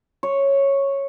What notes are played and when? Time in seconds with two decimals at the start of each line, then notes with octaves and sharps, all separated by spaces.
0.23 C#5